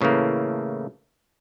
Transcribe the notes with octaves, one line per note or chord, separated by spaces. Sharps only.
A2 C#3 E3 A3 A#3